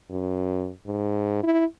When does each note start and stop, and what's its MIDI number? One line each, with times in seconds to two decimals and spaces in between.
0.10 0.70 42
0.87 1.40 44
1.43 1.65 64